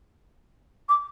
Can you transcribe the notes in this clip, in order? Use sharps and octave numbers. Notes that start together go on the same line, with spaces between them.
D6